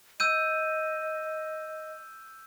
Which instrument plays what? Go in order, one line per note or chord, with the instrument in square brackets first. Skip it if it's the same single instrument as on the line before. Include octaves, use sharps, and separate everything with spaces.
[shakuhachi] D#5 [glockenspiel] E6 G6 D#7